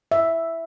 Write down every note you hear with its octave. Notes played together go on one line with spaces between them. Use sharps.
E5